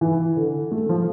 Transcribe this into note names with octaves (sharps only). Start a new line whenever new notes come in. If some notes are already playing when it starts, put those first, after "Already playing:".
E3
D3
A3
F3